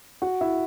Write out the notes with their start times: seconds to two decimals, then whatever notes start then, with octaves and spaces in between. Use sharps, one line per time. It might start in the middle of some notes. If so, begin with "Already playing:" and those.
0.22 F#4 F#5
0.41 E4 E5